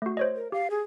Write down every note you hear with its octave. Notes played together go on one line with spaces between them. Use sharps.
A3 F#4
C5 C#5 D#5
A#4
G4 F5
G#4